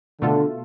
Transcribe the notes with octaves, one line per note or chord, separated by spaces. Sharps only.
B2 D3 A3 F4 A4